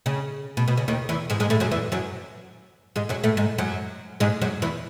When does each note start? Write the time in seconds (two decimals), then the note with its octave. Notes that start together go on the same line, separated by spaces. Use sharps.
0.06 C#3
0.57 B2
0.68 B2
0.77 C#3
0.88 D#2 D#3
1.09 E2 E3
1.30 G#2 G#3
1.40 G#2 G#3
1.50 A2 A3
1.60 F#2 F#3
1.71 E2 E3
1.92 F#2 F#3
2.96 G#2 G#3
3.09 F#2 F#3
3.24 A2 A3
3.37 G#2 G#3
3.58 F#2 F#3
4.20 G#2 G#3
4.42 F#2 F#3
4.62 E2 E3